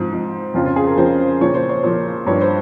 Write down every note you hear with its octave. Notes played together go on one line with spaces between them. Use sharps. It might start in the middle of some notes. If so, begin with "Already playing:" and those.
Already playing: G#2 F3 C4
G#2 F3
F2 C#3 F3 F4
F4
G#4
A#4
F2 C#3 F3 C5
A#2 F3 C#5
C5
C#5
A#2 F3 C#5
G2 F3 C#5
C5